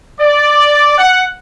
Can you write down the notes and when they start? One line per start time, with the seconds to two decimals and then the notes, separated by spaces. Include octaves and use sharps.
0.19 D5
0.97 F#5